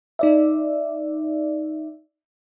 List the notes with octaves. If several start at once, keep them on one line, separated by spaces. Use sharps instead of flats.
D#4 D5 E5